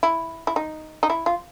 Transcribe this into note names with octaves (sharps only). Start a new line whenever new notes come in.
E4
E4
D#4
D#4
E4
F4